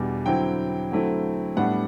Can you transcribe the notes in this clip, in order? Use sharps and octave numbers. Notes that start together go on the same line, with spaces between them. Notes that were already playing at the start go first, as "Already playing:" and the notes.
Already playing: E2 B2 G3 D4
D3 F#3 C4 E4 G5
D3 F#3 A3 C4 E4
A2 G3 B3 D4 F#5